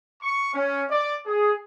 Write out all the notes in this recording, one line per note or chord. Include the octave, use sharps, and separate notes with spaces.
C#6
C#4
D5
G#4